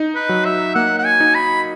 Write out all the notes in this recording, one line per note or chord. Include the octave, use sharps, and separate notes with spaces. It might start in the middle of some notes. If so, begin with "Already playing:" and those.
Already playing: D#4
B4
F#3
E5
A#3 F#5
F#5
G#5
D#4
B5